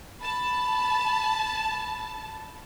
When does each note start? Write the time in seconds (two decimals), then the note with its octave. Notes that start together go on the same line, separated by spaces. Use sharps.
0.22 A5 B5